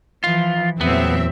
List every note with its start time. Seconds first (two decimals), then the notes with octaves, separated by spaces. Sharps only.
0.24 E3 F3 F4
0.81 E2 A#2 F#3 B3 C4 E5